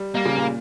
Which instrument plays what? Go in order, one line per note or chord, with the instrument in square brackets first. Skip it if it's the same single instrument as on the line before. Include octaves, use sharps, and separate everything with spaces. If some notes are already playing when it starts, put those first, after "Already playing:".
Already playing: [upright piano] G3
[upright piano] G3 [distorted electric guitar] A#3
[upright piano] C#3
A#2